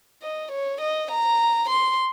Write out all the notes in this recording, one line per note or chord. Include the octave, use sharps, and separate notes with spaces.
D#5
C#5
D#5
A#5
C6